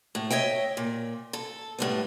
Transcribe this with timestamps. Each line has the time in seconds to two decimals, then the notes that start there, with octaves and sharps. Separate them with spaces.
0.15 A2
0.31 C#5 D#5 E5 G5
0.77 A#2
1.33 A4
1.78 A2 G3 B3